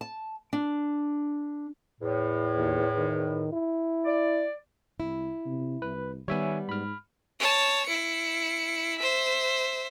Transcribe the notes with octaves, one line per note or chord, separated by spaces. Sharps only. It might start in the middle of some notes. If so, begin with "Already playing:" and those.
A5
D4
E2 A2
D#2
D#3
E4
D5
C2 E4
C3
C2 B4
D#3 G3 B3 C#5 E5 G#5
G#2 B5 F6
C#5 A5
E4 C#7
C5 E5